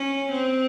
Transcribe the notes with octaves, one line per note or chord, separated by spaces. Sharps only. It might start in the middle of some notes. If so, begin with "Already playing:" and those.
Already playing: C#4
C4